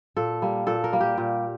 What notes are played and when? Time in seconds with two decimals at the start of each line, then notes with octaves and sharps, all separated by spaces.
0.17 A#2 A4
0.42 G3 A#3
0.67 A#2 A4
0.84 A#4
0.93 G3 A#3
1.01 G4
1.18 A#2